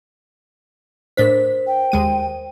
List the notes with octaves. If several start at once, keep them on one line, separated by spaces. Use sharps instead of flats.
A2 D4 A#4 C5 B6
G5
D#2 G#3 D#7